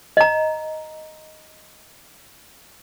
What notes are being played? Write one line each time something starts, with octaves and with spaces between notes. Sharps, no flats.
D#5 A#5